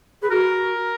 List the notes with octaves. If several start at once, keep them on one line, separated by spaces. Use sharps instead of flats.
G#4 B4
F#4 A#4